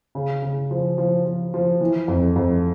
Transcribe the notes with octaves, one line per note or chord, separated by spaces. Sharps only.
C#3
C#3
F3
F3
F3
F3
E3
F2
F2